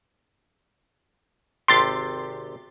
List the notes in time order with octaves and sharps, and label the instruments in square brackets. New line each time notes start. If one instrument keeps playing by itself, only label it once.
[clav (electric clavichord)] G#1 C3 G4 [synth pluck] C6 A6